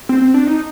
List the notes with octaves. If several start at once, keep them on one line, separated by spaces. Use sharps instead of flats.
C4
C4
D4
D#4